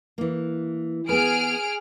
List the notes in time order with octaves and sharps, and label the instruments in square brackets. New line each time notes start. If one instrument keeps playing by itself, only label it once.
[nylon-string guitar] E3 A#3
[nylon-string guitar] B3 B4 [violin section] G#4 F6 D7